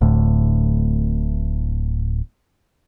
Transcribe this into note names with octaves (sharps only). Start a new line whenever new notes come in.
D1 D2 A2